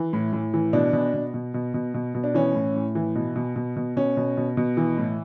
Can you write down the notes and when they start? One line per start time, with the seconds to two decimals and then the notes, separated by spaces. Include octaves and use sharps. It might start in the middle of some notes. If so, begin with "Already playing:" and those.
Already playing: E3
0.13 A2
0.33 A2
0.54 E3
0.73 B2 D4
0.93 B2
1.14 B2
1.34 B2
1.54 B2
1.74 B2
1.94 B2
2.15 B2
2.24 D4
2.34 E3 C#4
2.55 A2
2.75 A2
2.95 E3
3.15 B2
3.36 B2
3.56 B2
3.76 B2
3.96 B2 C#4
4.17 B2
4.37 B2
4.57 B2
4.77 E3
4.98 A2